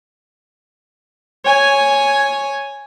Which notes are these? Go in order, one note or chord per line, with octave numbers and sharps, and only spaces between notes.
C#5 G#5